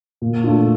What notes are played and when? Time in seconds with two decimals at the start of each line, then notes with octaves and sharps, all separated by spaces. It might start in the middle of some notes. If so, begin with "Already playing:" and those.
0.22 A#2
0.44 A3 D4 F4